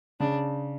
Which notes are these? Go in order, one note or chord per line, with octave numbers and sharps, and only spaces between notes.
C#3 D4